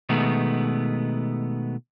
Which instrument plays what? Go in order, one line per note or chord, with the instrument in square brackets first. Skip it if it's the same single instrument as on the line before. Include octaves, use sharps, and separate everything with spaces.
[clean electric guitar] B2 D#3 G#3 A3 B3